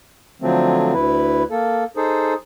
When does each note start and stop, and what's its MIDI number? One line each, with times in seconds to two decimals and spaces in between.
0.42 0.93 50
0.42 0.93 53
0.42 0.93 54
0.42 0.93 57
0.42 0.93 60
0.93 1.43 38
0.93 1.43 64
0.93 1.43 71
1.51 1.84 58
1.51 1.84 69
1.97 2.34 63
1.97 2.34 68
1.97 2.34 69
1.97 2.34 72